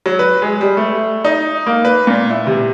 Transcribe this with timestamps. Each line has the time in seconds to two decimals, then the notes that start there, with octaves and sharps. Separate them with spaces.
0.06 F#3
0.19 B4
0.42 G#3
0.61 G3
0.77 A3
1.24 D#4
1.66 A#3
1.85 B4
2.07 A#2
2.30 E4
2.47 C3